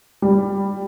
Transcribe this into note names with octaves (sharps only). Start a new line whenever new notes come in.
G3